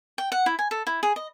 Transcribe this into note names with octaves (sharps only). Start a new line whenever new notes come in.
G5
F#5
E4
G#5
A4
E4
G#4
D#5